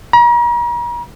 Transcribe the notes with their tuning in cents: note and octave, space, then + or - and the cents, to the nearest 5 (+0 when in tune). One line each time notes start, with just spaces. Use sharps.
A#5 +40